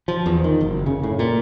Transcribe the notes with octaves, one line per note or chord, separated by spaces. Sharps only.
F3
E2
D#3
F#1
C#3
A2
A#2